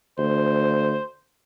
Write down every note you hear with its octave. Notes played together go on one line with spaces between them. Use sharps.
D2 C5